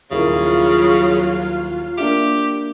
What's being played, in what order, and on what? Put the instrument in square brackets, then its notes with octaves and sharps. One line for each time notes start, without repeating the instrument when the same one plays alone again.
[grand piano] D#1 E4 A#4 [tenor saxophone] C#3 [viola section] F#3 F4 F5
[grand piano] A#3 D4 E5 [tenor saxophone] G4